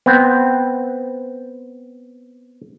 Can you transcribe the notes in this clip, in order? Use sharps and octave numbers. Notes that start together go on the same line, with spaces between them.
B3 C4